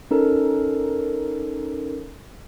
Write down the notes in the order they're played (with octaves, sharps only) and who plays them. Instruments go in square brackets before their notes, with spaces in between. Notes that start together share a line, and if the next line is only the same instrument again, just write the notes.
[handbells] C#4 D#4 A4 A#4